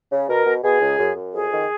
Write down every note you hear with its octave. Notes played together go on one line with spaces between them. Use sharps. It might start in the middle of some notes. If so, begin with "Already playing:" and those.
C#3
B2 A#4
B2
B2 G#4
C#2
F#2
F#2
F2 G#4
D#3